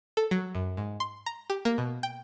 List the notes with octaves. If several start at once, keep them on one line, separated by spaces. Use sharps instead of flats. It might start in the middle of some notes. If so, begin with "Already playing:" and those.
A4
F#3
F#2
G#2
C6
A#5
G4
A#3
B2
G5